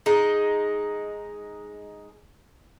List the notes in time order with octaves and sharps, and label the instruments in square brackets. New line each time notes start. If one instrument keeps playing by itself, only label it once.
[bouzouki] G#3 D#4